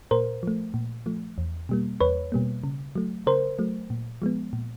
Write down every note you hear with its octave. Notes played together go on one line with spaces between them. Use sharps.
A#2 A#4 C5
F3 A3
A#2
F3 A3
E2
B2 G3 A#3
E2 B4 C#5
B2 G3 A#3
C#3
F#3 A3
C#3 A#4 C5
F#3 A3
A#2
F3 G#3 B3
A#2